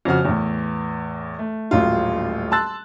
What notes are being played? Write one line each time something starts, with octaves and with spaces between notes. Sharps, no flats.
F2 C#3 F#4 F6
E2 A2
A3
D#1 A1 A2 F#3 F4
A5 C6 E6 F#6 A6